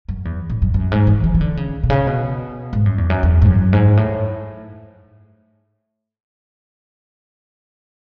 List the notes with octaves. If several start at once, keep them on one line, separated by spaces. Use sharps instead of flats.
F#2
E2
A2
F#2
F#2
G#2
E3
E3
E3
D3
C#3
B2
C#3
B2
G#2
F#2
E2
F#2
E2
G#2
F#2
G#2
A2